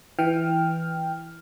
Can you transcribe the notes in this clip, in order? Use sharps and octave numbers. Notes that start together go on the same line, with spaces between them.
E3 G5 F6